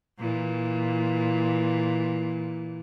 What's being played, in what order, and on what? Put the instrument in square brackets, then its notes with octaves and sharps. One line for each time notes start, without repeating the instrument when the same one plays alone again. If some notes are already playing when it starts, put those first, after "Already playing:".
[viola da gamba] A#2 E3